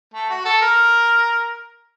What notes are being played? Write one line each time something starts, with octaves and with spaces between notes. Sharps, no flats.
A3
F#4
A4
A#4